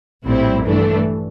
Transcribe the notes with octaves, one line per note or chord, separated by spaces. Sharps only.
A#1 A2 G3 C4 E4
G2 E3 A3 D4